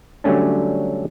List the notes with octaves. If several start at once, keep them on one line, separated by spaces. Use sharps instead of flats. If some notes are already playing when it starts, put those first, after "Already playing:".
D3 F#3 G3 A3 C#4 D4